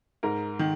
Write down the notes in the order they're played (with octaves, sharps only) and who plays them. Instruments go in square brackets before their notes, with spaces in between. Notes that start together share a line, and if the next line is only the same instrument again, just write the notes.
[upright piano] G#2 A#4
D#3